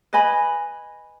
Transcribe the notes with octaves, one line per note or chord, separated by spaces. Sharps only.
B4 D#5 G#5 B5